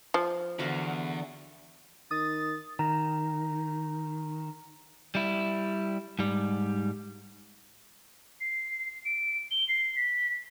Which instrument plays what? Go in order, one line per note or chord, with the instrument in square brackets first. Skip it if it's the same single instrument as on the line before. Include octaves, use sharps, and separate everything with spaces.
[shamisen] F3
[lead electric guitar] E2 [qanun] D3 F#4 F5
[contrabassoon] D#3 [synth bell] D#6 [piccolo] A6
[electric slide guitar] D#3 [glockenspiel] A#5 A#6
[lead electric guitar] G3 E4
G#2 G3
[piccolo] C7
D7
G7
C7
B6